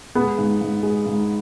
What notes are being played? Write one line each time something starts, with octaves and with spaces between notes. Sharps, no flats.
G#3 B3
G#2
G#2
G#3
G#2